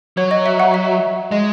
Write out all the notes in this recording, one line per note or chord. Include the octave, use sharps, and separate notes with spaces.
F#3 C#5
D#5
E5
F#5
E5
G#3 D#5